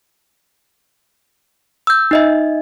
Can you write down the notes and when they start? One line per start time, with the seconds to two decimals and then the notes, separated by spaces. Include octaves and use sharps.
1.87 E6 G6
2.11 D#4 D#5 E5